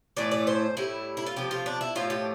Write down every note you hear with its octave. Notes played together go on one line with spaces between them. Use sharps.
A2 E3 A3 D5
D5
C5
A2 G3 E4
E4
F4
C3 F3 A3 G4
F4
D4
E4
A2 F3 A3 F4
G4